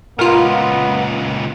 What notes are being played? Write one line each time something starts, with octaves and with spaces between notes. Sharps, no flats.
C#2 A#2 B3 F4 A#4